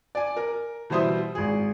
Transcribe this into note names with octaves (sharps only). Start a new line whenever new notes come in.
D5 G#5
A#4
B2 E3 G3 C5 E5 D#6
G#1 G#4